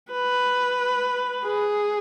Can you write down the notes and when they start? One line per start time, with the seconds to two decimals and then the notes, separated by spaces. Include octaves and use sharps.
0.11 B4
1.45 G#4